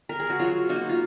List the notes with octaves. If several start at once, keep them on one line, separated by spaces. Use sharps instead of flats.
A#4
G#4
F#4
F#3 F4
A#3 D#4 F#4
F4